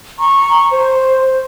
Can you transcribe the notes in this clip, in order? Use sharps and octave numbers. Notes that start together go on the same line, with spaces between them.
A#5 C#6
C5